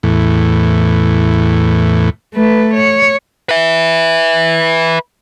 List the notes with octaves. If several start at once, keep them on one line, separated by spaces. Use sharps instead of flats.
E2 A2
A3 B4
C#5
B4 E5